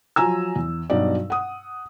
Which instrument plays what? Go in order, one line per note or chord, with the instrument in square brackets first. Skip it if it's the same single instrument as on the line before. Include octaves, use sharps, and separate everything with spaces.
[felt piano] F3 F#3 G#5 A#5 E6
E2
G2 B2 F#3 D#4 F#4 D5
F#5 D#6